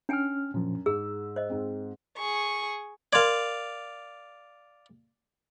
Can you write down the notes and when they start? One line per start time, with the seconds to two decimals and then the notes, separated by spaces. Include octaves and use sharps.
0.09 C#4 D4 G5 G#5 F6
0.54 F#2 A#2 F3
0.86 G#2 G#4 E6
1.36 C5 D#5
1.50 G#2 C4
2.17 G#4 C#6
3.13 A#4 D5 F5 C6 G#6